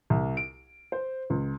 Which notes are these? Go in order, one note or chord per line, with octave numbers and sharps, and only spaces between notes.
C2
D7
C5
C#2